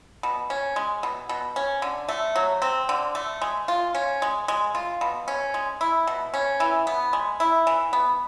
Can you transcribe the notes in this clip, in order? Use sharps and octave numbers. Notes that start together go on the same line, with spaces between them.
B2
C#4
G#3
B2
B2
C#4
D3
A3
F#3
C4
D3
A3
G#3
F4
C#4
G#3
G#3
F4
B2
C#4
G#3
E4
B2
C#4
E3
B3
G#3
E4
E3
B3